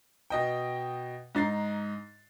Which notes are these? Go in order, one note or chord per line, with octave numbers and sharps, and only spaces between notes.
B2 D#5 G5
G#2 D#4 A6 C7